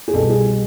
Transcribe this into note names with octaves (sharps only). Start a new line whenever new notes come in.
G#4
C2 B2 G3 A4
G#4